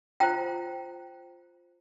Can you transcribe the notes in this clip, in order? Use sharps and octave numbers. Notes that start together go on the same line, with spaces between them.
F4 C5 G5 A#5